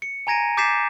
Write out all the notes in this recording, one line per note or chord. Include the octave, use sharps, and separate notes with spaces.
C#7
G#5 A#5 G#6 A#6 D7 D#7
D6 G6 A6 B6 C7 E7